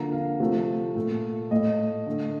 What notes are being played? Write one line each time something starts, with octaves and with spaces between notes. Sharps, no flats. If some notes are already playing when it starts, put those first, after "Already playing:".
Already playing: D3 F3 A#3 A#5
F5
C3 F3 A3
A#2 A3
A2 A3 D#5
D3 A3